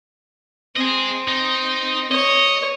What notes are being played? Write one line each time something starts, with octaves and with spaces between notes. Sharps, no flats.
C4 G#4 D#5
D#4
C#5 D#5